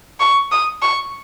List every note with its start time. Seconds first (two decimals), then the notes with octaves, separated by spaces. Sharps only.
0.20 C#6
0.52 D#6
0.82 C#6